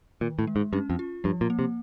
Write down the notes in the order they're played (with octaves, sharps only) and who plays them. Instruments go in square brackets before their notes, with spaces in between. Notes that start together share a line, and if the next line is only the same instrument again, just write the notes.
[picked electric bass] A#2 [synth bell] D#3
[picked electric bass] A2
[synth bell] G#3
[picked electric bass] G#2
[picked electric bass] G2 [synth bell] C#4
[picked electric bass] F2
[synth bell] F4
[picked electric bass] G2 [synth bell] F3
[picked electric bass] A#2
[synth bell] A#3
[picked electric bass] C3